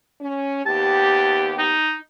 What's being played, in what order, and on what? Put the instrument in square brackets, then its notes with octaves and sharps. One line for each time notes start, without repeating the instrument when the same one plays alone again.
[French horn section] C#4
[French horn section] D#2 B3 G4 [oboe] A5
[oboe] D#4